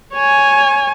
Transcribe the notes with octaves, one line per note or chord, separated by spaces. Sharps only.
C#5 G#5